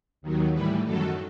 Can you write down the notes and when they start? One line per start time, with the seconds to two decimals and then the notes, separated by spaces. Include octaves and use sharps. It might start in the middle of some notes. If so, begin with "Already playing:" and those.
0.22 D#2 D#3 F#3
0.53 A2 E3 G3 B4
0.85 F#2 D#3 F#3 A4